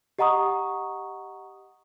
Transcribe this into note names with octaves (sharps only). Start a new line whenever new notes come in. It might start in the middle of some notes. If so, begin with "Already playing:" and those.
G4 D#5 F#5 A#5 C#6 D#6